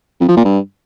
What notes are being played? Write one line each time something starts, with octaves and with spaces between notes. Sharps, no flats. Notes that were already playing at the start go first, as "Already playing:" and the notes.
F2
F3
A#2
G2